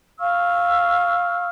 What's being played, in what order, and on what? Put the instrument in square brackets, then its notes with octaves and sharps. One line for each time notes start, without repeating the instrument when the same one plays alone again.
[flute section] F5 C#6 E6 F6